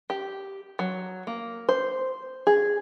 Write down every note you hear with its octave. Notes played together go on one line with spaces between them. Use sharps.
G4
F#3
A#3
C5
G#4